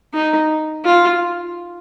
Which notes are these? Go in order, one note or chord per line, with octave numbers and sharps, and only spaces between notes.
D#4
F4